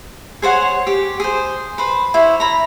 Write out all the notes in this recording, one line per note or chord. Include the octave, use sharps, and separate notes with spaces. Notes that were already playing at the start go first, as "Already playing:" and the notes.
G#4 C5 C#5 F#5
G4
G#4 C5
B4 C5
E4 C5 C#5
A#5 B5